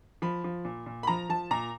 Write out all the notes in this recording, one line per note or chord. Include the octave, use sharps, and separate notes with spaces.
F3 B5
F3
A#2
A#2
B5
F3 A#5
F3 A5
A#2 A#5